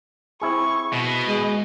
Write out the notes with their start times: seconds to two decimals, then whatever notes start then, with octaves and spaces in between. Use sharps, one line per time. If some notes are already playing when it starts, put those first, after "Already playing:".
0.41 C4 E4 G#4 C#6
0.93 B2 D#5
1.27 G#3